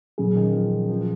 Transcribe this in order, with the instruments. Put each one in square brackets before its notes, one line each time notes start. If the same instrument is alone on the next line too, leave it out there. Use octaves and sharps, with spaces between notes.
[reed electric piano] A#2 F#3 C#4 G#4 [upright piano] C#3
[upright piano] D#3
F3
F3